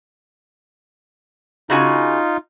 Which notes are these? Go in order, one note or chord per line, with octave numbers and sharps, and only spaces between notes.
C#3 D#4 F4 F#4 G#5